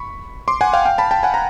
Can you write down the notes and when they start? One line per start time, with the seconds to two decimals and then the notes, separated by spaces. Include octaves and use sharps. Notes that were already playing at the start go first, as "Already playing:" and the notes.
Already playing: B5 C#6
0.48 C6 D6
0.61 F#5 G#5
0.73 F5 G5
0.85 F5 G5
0.98 A5 B5
1.11 G5 A5
1.23 F#5 G#5
1.34 A#5